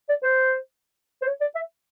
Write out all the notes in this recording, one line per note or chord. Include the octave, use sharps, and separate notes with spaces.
D5
C5
C5
C#5
D5
E5